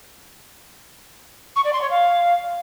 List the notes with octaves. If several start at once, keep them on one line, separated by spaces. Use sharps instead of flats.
C#6
D5
C6
C#5
F5